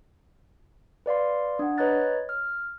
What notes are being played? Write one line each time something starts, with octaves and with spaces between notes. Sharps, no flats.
B4 D5 F5 C6
D4 F#5
B4 C#5 D#5 A#5 F#6 A6
F6